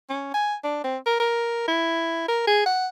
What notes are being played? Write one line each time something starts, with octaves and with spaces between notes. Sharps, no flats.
C#4
G#5
D4
C4
A#4
A#4
E4
A#4
G#4
F#5